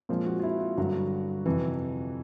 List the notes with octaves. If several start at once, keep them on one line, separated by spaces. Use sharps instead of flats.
A#2 F3 G#3 C4
F#4
F4
E4
F4
G2 D3 F#3 F#4
F2 C3 E3